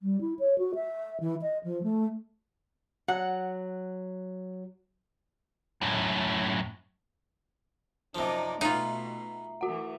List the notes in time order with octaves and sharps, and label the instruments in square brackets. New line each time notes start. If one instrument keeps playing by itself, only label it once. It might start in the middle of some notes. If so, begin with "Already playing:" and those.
[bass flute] G3
E4
C#5
F#4
E5
E3
D#5
F3
A3
[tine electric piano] F#3 [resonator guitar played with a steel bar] F#5
[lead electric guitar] F#2 A2
[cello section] F#2 D#4 D5 [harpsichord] C3 F3
[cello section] B2 A3 [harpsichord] B3 F5 [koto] D#4 F4 [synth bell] E5 A#5
[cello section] E3 A3 [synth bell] F#4 F#5